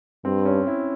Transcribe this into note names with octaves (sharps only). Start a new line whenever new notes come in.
G2 C4
C#4
E4